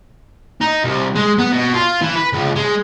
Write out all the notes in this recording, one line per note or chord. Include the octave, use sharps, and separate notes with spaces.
D#4
C2
G#3
B3
B2
F4
E3
B4
C#2
G#3